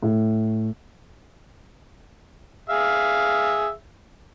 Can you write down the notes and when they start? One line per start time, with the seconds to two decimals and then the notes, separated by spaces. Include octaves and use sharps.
0.03 A2
2.69 G#4 E5 F5